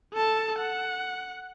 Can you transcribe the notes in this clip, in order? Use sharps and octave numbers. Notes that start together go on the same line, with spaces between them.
A4 A5
F#5